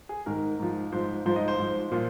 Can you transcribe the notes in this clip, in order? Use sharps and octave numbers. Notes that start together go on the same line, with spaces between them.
G#4
G#2 D#3 A#4
G#2 F3
G#2 F3 C5
G#2 F3 C5
D#5
C5
G#2 F3
A#2 F3 F5